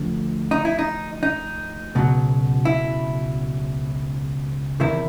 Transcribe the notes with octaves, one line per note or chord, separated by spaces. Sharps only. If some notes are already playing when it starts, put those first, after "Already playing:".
Already playing: D2 D3 F3
D#4
E4
D#4
D#4
C#2 B2 F#3
E4
E2 C3 D#3 E4